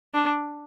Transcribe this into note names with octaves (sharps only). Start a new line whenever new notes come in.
D4